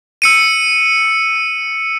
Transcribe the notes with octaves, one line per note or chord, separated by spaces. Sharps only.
E6 C#7 D#7